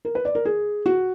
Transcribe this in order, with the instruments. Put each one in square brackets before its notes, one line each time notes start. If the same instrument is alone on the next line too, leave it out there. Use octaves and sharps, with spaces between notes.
[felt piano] A#4
B4
D5
A#4
G#4
F#4